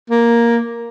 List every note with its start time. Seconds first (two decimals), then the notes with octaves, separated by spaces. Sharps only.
0.10 A#3